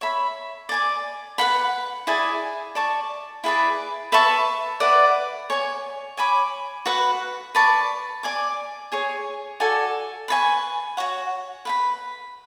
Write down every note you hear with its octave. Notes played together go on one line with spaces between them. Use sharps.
C#5 E5 B5
D5 G#5 D6
B4 F#5 B5
E4 G#4 D5 G#5
D5 A5 C#6
E4 G#4 B4 D5
B4 E5 A5 C#6
E4 B4 D5 F#5
C#5 G#5 C#6
C#5 G#5 B5 D6
F#4 B4 F#5
B4 D5 A5 C#6
D5 G#5 D6
G#4 C#5 G#5
F#4 A4 D5 G#5
B4 D5 G#5 C#6
F#4 C#5 F#5
B4 F#5 B5